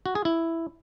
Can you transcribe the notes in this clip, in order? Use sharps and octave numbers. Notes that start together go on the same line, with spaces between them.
F#4
G#4
E4